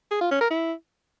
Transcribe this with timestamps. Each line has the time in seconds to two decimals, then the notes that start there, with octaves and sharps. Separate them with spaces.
0.11 G#4
0.21 F4
0.31 C#4
0.41 A#4
0.50 E4